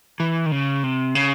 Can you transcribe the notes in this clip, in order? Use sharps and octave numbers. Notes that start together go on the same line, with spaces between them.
E3
D#3
C#3
C3
C#3